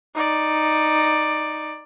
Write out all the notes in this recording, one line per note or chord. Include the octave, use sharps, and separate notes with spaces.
D#4 D5